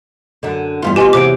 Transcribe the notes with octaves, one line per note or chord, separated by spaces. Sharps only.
F#2 D3
E2 G2 F4
B2 F4 G4 G#5 C6
E2 C3 F#3 D6 D7